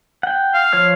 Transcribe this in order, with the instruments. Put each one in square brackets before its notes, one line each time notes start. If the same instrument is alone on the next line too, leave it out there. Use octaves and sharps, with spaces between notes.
[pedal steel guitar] F#5 G5
[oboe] F5
[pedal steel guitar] F3 C#5 F6